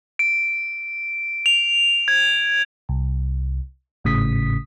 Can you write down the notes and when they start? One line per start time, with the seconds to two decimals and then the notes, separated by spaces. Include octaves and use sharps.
0.19 D7
1.46 F7
2.08 G#6
2.89 C2
4.04 G#1 A2 C#3 D#6 B6